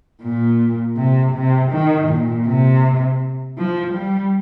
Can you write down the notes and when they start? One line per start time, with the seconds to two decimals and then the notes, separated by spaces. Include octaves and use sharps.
0.23 A#2
0.97 C3
1.35 C3
1.72 D#3
2.09 A#2
2.47 C3
3.58 F3
3.94 G3